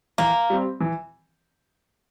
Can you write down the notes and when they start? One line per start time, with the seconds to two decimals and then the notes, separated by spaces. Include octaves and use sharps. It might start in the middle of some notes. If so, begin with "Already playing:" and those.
0.18 E3 A#3
0.50 G3 C4
0.81 E3